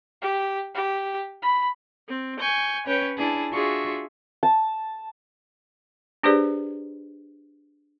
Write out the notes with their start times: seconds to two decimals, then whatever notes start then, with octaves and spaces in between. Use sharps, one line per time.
0.22 G4
0.74 G4
1.42 B5
2.08 C4
2.39 G#5 C#6 G6
2.87 C#4 B4 C#5 G5
3.17 D4 E4 G#4 A5
3.53 D4 F4 F#4 G#4 E5 C#6
4.43 A5
6.23 D4 G4 G#4 B4 C5 D5